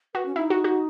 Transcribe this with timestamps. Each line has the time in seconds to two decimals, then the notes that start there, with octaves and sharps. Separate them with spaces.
0.15 F#4 B4
0.25 C#4
0.36 D#4 E4
0.50 F#4
0.64 F#4